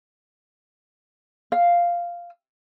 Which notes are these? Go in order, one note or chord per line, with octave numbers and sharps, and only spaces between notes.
F5